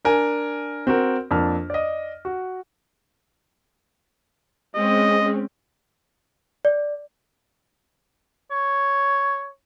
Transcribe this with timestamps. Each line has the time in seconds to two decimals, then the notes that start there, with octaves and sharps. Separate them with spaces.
0.05 D4 A#4 G#5
0.87 C4 F#4 A#4
1.31 F2 A#3 D4 A5 F6
1.70 D5 D#5
2.25 F#4
4.75 G#3 C4 C#4 D#5
6.65 D5
8.51 C#5